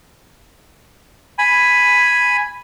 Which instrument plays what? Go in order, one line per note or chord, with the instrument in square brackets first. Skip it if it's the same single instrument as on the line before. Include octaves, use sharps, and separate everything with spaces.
[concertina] G#5 B5